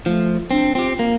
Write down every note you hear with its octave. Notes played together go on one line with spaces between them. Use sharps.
F3 A3
C4 D4
C4 F4 G4
A#3